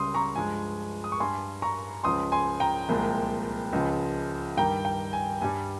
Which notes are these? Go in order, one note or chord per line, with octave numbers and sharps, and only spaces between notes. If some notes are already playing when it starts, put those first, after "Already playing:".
Already playing: C#2 C#3 G3 C6 D#6
A#5 C#6
G2 F3 G#3 G#5
D#6
C#6
G2 G3 G#5 C6
A#5 C#6
C#2 C#3 F3 G#3 C6 D#6
G#5 C6
G5 A#5
C2 A#2 F3 G#3
C#2 C#3 F3 G#3
G2 D#3 G3 G5 A#5
G5
G#5
G2 G3 G#5